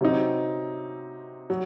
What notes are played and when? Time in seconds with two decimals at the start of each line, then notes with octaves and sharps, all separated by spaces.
0.01 C3 F#3 C4 D#4
1.50 F#3